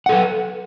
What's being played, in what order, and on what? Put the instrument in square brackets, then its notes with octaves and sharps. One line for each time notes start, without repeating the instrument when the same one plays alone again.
[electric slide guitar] F#5
A4
B4